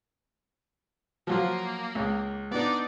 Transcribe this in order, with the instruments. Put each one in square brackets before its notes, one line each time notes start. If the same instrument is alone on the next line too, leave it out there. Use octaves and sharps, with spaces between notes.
[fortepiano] F3 F#3 F4 [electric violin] A#3
[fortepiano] C#2
[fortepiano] B3 D4 [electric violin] D#4 D5